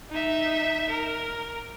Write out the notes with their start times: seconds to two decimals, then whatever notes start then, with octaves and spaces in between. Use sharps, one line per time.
0.11 D#4 E5
0.90 A#4